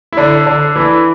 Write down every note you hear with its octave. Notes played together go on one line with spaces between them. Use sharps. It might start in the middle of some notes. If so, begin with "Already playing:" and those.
E4
D3 D4
D3 D4
E3 E4